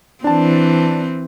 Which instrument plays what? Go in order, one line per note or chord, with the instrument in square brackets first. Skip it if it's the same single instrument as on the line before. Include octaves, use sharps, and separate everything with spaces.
[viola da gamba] E3 C4 [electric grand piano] D4 A5